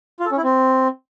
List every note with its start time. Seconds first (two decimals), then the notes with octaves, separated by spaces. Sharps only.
0.20 F4
0.26 A4
0.32 C#4
0.37 E4
0.43 C4